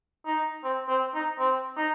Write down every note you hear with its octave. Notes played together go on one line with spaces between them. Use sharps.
D#4
C4
C4
D#4
C4
D#4